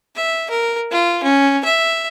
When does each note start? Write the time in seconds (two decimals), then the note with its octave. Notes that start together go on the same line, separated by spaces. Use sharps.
0.16 E5
0.50 A#4
0.91 F4
1.23 C#4
1.64 E5